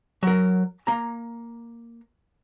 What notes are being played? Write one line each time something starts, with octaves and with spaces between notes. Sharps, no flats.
F#3 A#4
A#3 A#5